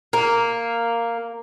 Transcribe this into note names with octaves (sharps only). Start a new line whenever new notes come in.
A#3